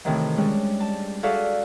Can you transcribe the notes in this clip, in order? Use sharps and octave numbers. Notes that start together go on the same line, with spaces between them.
A2 C3 D#3 E3
G3 G#3 C#4 D4
A5
F#4 G#4 A4 D5 E5 F5